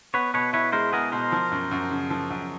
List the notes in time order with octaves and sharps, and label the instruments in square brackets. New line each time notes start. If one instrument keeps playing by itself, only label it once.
[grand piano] B3 [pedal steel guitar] B4 C#5
[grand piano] B2 [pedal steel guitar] B4 C#5
[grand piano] E4 [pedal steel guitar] B4 C#5
[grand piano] G#3 [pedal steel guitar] A#4 C5
[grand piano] B3 [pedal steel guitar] G#4 A#4
[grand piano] B2 [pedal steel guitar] A#4 C5
[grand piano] F3
F#2
F#2
C#3
F3
F#2